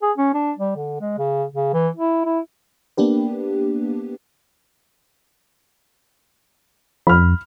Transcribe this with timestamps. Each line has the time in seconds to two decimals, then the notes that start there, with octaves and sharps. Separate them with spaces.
0.02 G#4
0.18 C#4
0.34 D4
0.58 G3
0.76 D3
1.01 G#3
1.18 C#3
1.54 C#3
1.74 E3
1.97 E4
2.25 E4
2.97 A#3 B3 D4 G4 B4
7.07 F2 B5 F6